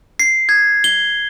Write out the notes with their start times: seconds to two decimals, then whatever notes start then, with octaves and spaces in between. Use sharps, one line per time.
0.19 C7
0.49 G#6
0.84 G7